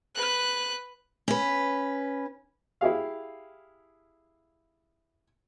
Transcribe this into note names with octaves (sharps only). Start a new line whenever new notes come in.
B4 F#6
C#4 B4
E4 G4 G#4 F5